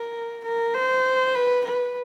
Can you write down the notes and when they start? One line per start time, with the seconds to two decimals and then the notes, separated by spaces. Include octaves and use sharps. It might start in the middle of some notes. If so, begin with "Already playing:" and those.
Already playing: A#4
0.44 A#4
0.74 C5
1.35 B4
1.65 B4